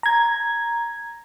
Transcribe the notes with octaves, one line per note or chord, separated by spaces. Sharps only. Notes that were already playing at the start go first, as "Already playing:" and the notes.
A#5 G#6